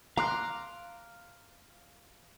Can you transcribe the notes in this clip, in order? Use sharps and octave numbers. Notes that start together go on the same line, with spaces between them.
F5 A#5 C6 D6 F#6